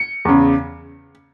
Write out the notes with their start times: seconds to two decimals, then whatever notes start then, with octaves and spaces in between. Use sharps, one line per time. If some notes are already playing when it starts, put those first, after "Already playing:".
Already playing: C#7
0.25 E2 C#3